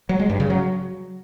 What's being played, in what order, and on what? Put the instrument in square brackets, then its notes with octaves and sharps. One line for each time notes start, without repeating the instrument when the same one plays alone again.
[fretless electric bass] F#3
G#3
G2
C#3
F#3